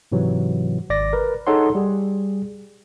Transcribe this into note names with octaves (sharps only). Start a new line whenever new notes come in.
G#2 C3 E3 F#3
G#1 D5 A#6
A#4 B4
D#4 G#4 A4 C#5 F#5 C6
G3 G#4